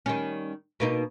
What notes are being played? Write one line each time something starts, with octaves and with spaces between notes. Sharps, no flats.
D#3 G3 C#4
B2 A#3 D#4